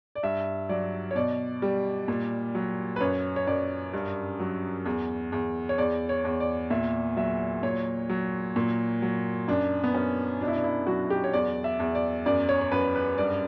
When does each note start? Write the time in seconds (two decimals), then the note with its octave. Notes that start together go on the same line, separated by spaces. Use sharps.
0.15 D5
0.23 G2 E5
0.69 F#3 D5
1.11 C#5
1.15 B2 D5
1.62 G3
2.08 A#2
2.55 F#3
2.96 B4
3.01 F#2 C#5
3.36 C#5
3.47 F#2 D5
3.93 G2
4.39 F#3
4.86 E2
5.32 E2
5.69 C#5
5.78 E2 D5
6.09 C#5
6.25 E2
6.40 D5
6.70 A#2 E5
7.16 F#3 E5
7.63 A#2 C#5
8.09 F#3
8.56 A#2
9.02 F#3
9.48 F#2 D4
9.84 B3
9.94 F#2 C#4
10.41 B2 D4
10.48 E4
10.56 D4
10.64 E4
10.87 F#3 F#4
11.10 G4
11.24 C#5
11.33 E2 D5
11.64 E5
11.80 E2
11.95 D5
12.26 F#2 D5
12.49 C#5
12.61 C#5
12.72 F#2 B4
12.95 B4
13.18 G2 D5